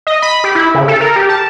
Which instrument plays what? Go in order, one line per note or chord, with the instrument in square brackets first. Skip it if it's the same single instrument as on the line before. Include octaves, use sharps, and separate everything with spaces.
[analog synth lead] D#5
B5
G4
E4
C#3
A4
A#4
G4
A5